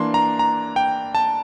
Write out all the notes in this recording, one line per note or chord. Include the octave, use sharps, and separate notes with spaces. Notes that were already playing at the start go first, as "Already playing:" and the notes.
Already playing: E3 A#3 D4 C6
A#5
A#5
G5
A5